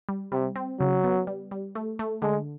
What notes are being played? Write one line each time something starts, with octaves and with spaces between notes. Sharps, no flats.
G3
C3 G3
C4
C#3 F#3
B3
G3
G3
A3
A3
D3 G#3